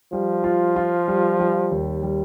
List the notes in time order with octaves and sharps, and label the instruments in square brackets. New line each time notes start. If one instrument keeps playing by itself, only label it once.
[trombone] F3 [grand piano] G3
[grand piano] F4
F4
G3
G3
D#2
G3